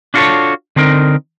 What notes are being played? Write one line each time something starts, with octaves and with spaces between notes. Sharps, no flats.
D4 F4 F#4 G#4 A4 C#5
D3 C4 D#4 A#4